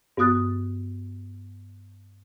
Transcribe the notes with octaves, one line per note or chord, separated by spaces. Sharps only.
G2 B3 F#4 D#6 F#6 A6